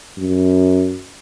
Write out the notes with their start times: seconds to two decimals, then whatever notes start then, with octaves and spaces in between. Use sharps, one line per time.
0.19 F#2